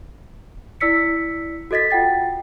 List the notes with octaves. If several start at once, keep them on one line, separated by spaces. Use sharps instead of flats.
E4 D5 E6 B6 C#7
F#4 A4 D#5 A6 B6
F4 F#5 G5 A6